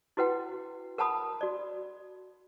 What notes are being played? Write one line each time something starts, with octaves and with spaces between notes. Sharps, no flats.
E4 F#4 B4 F#5 G5
A#4 F#5 A5 B5 D#6
F#4 D5